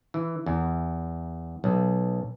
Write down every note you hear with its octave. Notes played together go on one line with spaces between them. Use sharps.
E3
E2
B1